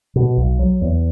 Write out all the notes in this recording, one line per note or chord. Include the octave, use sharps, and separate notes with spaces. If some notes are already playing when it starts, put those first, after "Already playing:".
B2
B1
F#3
E2